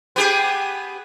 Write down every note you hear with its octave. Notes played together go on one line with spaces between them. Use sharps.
B3 G4 G#4